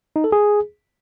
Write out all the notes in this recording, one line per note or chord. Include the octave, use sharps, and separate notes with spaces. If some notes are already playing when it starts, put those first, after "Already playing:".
D#4
A4
G#4